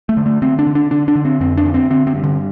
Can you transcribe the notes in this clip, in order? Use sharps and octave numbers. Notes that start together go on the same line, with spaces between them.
A3
D3
A3
D3 C4
D4
D3
D4
D3 D4
D4
D3
C4
F2 C4
D4
D3
C4
D3 C4
C4
G2
D3